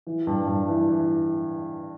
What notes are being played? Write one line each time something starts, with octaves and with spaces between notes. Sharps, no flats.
E3
G2
G2
E3
E3